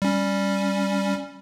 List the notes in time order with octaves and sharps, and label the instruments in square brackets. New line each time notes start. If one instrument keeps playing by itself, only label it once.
[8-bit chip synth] G3 C#4